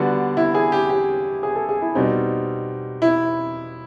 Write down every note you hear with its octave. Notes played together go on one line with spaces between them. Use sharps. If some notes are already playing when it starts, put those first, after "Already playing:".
Already playing: D3 G3 B3 D4 F#4
E4
G#4
G4
G4
G#4
A4
G#4
E4
B2 G3 C4 D#4
E4